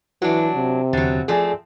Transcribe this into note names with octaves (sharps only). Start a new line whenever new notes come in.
E3 F#3 D4 F#4
C3
E2 B2 D3 F#3 A6
F3 A3 C4 G#4 D5 G#5